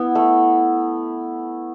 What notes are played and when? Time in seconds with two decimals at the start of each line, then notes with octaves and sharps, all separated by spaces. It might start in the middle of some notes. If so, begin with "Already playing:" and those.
Already playing: B3 E4
0.15 A3